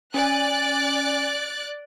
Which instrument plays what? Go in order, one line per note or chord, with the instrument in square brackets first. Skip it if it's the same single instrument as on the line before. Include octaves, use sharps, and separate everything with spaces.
[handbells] C#4 G#5 [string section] D5 F#6 A6